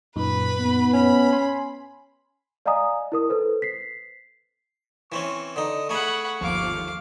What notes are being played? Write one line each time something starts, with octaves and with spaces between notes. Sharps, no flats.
F#2 A#2 D#4 B4 B5
B3
C#4 B5
G#5 C6
D5 D#5 F5 G#5 A#5 D#6
E4 A#4 D#6
A4 B4 C5
B6 C7
E3 C4 C#4 C#6
D3 D#4 D#6
A3 G#4 F#5 B5 C#6
G1 D#2 F3 F5 D6